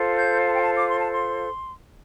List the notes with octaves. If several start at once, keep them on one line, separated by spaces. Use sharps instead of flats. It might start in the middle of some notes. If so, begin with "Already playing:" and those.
Already playing: F4 A4 C5
G6
A5
G5
A5
D6
C6
A5
C6